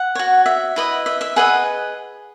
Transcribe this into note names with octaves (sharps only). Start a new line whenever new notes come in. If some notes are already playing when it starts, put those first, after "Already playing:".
Already playing: F#5
F#4 C#5
E5
E4 B4 D#5
E5
E5
G#4 B4 D#5 F#5